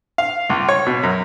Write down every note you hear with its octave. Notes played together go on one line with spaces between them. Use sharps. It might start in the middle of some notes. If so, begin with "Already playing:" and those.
F5
C#2
C#5
B2
F#2